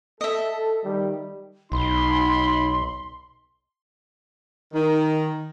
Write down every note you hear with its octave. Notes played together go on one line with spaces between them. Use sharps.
A4 D#5 E5
D#3 G3
B1 D#4 B5 C6
D#3